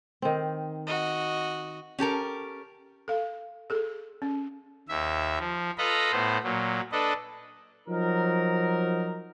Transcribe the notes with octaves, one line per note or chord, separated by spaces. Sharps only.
D#3 C4
F#4 D#5
C#4 G4 A4 A#4
A4 F5
G#4 A4
C#4
D#2 E5
F3
F4 A4 B4 D#5 A#5 B5
A2 B3 C5
A#2 F#3
D4 A4 B4 D#5
F3 F#3 D#4 A#4